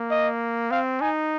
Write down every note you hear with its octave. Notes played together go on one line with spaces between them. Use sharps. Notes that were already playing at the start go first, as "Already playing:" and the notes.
Already playing: A#3
D#5
C4 F5
D#4 G#5